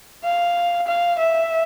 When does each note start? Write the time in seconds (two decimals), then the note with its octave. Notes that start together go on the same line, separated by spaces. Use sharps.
0.24 F5
0.88 F5
1.19 E5